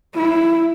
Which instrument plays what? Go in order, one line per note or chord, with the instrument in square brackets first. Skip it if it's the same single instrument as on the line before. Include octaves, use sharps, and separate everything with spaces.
[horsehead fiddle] E4